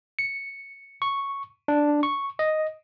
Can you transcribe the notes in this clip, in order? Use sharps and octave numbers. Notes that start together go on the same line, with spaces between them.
C#7
C#6
D4
C#6
D#5